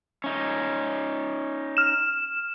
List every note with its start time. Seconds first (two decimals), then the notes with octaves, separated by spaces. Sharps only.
0.24 C#4 D#4
1.77 F6 E7